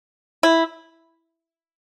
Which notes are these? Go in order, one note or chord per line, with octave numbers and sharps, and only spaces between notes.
E4